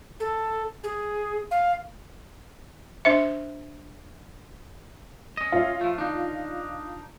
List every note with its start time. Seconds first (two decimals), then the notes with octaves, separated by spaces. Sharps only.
0.20 A4
0.84 G#4
1.51 F5
3.05 D4 C5 E5
5.37 C#4 D#5
5.52 F4 C#5 E5 F5
5.81 F3 A3
5.98 D#3 D4 D#4